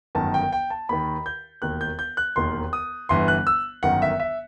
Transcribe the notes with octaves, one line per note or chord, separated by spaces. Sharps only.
G1 F#2 D#3 A5
G5
G5
A5
D#2 D#3 B5
G6
E1 D#2 D#3 F#6
G6
G6
F#6
E1 D#2 D#3 C6
D#6
G1 G2 E3 C6
F#6
E6
G1 F#2 D#3 F#5
E5
E5